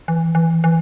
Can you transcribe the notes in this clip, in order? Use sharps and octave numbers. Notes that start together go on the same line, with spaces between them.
E3
E3
E3